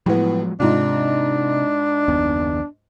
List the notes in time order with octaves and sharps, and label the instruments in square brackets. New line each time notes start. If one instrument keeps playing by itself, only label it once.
[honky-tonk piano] A2 B3 [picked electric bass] F3 F#3 G#3
[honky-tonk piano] G#2 F4 [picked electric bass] C3 [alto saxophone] D4
[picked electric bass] F#1 D#2 B3